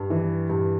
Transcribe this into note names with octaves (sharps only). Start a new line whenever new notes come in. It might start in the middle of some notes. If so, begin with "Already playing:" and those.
Already playing: G2
E3
G2